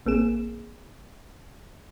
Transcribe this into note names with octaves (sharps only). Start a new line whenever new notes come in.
A1 A#3 C4 G#4 E7